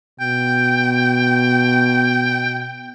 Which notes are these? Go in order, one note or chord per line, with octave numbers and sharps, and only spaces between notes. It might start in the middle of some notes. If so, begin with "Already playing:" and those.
B2 G5